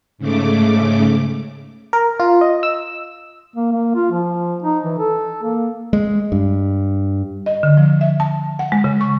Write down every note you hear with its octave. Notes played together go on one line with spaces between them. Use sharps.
G#2 C#3 A3 D6
A#4
F4
D#5
E6
A#3
A#3
F4
F3
D#4
E3
A4
A#3
G#3
G2
D#5
D3
F3
E5
A5
F#5
G#3
C#3
C#6